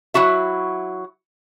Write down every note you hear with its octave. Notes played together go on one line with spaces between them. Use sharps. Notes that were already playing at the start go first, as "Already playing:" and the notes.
F#3 E4 F#4 E5